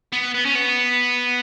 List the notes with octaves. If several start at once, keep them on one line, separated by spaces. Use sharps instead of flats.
B3
B3
C#4
B3